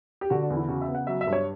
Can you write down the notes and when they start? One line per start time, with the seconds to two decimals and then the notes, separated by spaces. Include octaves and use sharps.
0.21 G4
0.30 D3 F#4
0.43 D4
0.50 E2
0.57 E4
0.68 C#3 F#4
0.81 E5
0.88 B3
0.95 F#5
1.07 F#3 E5
1.21 E5
1.27 G2
1.33 C#5